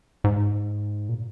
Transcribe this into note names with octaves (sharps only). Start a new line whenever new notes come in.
G#2
A#2